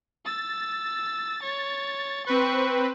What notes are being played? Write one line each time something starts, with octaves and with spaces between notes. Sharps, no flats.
E6 A6
C#5
C4 B4 C#6